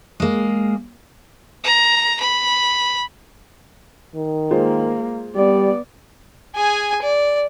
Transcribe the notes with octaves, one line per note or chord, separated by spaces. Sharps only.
G#3 A#3
A#5
B5
D#3
G#3 A#3 F4 C5
G3 B3 D5
G#4 G#5
D5